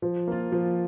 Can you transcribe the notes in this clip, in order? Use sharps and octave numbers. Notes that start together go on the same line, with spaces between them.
F3
A#3 F4
F3